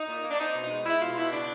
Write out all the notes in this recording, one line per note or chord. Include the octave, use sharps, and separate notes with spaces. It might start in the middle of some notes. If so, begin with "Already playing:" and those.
Already playing: D#4
A#2
A#3
D4
C4 D#4
B2
D#4
G#3
G#3 E4
B2 F4
B2 E4
C#3 D4